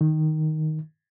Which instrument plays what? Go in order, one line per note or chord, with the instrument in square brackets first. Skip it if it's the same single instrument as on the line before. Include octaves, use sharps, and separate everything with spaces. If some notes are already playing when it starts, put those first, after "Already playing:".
[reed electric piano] D#3